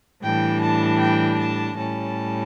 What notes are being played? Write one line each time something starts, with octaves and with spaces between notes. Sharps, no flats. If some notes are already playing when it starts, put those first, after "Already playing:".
A2 E3 G3 D4 G5
A5
G5
A5
A2 G3 C#4 A5